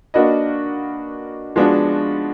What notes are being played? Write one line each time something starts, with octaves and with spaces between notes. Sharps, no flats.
A#3 D4 F#4 B4 D#5
F3 G#3 B3 D4 F#4